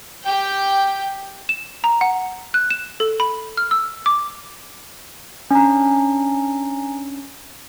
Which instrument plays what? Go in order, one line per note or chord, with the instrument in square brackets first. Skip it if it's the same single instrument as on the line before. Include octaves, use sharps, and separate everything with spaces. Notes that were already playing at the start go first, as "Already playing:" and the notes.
[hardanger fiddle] G4 G5
[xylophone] E7
A#5
F#5
F#6
E7
A4
B5
F6
E6
D6
[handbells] C#4 D4 [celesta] G#5 A#5